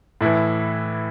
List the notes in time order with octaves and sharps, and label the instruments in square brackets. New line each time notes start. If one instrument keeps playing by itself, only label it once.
[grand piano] A2 E3 E4